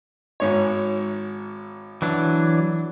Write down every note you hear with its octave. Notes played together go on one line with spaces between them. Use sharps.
G#1 G#2 C#5
E3 F#3 D4